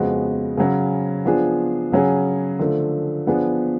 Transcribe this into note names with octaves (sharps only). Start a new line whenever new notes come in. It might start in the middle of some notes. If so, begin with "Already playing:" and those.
Already playing: F2 C#3 G#3 B3 F#4
C#3 F#3 C#4
F3 B3 D4 F4 G#4
C#3 F#3 C#4 G#4
D3 F3 A3
F3 B3 D4 G#4